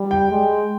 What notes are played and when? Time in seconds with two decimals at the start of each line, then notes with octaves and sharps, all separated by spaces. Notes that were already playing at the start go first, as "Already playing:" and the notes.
Already playing: G3
0.11 G5
0.31 G#3